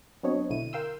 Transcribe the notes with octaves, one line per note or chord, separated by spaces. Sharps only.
F#3 B3 C4 D4 C#5 D#5
B1 D3 E4 D#7
A#4 F5 G5 C6 E6